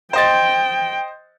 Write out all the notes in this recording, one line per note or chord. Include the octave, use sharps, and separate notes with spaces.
C5 D#5 G5 A6